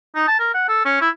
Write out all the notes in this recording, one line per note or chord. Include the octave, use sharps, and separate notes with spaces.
D#4
A5
A#4
F#5
A4
C#4
E4